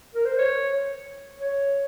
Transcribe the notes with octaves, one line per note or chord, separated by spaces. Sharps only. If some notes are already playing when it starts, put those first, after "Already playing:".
A#4
C5
C#5
C#5